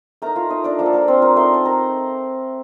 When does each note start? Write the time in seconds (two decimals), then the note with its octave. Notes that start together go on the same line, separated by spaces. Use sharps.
0.22 A3 D#4 A#4 A#5
0.36 F4 F5
0.50 D#4 D#5
0.64 D4 D5
0.79 F3 A#3 F4
0.86 A4
0.93 A#3 A#4
1.08 C4 C5
1.22 A#4 A#5
1.36 A3 D#4 C5 C6
1.54 A5
1.65 A#4 A#5